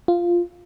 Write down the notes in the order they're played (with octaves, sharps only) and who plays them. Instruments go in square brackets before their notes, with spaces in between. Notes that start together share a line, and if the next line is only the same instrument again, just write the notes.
[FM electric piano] F4